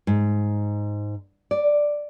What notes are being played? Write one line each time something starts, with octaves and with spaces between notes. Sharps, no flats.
G#2
D5